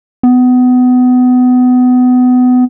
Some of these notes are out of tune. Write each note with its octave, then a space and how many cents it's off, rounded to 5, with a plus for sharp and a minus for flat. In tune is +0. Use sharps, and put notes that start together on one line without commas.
B3 +25